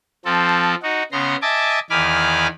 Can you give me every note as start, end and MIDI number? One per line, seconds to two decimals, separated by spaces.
0.25 0.75 53
0.25 0.75 60
0.25 0.75 69
0.83 1.03 63
0.83 1.03 66
1.12 1.36 49
1.12 1.36 59
1.12 1.36 82
1.12 1.36 84
1.42 1.79 75
1.42 1.79 76
1.42 1.79 80
1.42 1.79 81
1.42 1.79 86
1.90 2.47 40
1.90 2.47 51
1.90 2.47 80
1.90 2.47 83
1.90 2.47 86
1.90 2.47 89